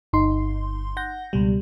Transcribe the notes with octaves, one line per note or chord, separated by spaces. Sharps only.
G1 D#4 C6
F#5 G6 A#6
C#2 B2 G3